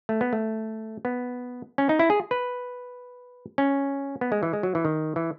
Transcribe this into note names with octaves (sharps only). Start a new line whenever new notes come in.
A3
B3
A3
B3
C#4
D#4
E4
G#4
B4
C#4
B3
G#3
E3
G#3
F#3
E3
D#3
E3